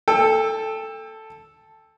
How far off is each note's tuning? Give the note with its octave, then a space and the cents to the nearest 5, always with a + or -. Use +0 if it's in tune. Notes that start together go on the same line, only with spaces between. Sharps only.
A4 +0 G5 +30